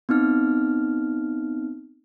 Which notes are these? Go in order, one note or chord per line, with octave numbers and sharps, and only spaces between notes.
B3 C4 D#4 F6